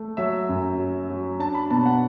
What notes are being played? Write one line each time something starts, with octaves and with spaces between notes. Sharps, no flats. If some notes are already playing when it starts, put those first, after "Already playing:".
Already playing: A3
F#3 E5
F#2
F#3
F#3
D4 A5
B5
B2 A5
F#5